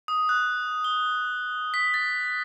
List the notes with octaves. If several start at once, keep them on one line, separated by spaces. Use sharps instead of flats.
D#6
F#6
G7
B6
A6